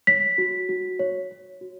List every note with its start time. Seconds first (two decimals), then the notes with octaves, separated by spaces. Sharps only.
0.07 C#5 B6
0.38 F#4
0.69 F#4
0.99 C#5
1.31 C#5
1.61 F#4